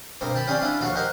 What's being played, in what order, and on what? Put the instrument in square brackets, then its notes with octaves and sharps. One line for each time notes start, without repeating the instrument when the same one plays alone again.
[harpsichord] G2 B2 A#3 C4
G4 A5 B5
C4 C#4 F4 G4 G#4 D5
G3 C#4 D4 E4 F4
A#1 D#2 F#4 A4 F5 C#6
G4 A#4 C5 D#5 F5 F#5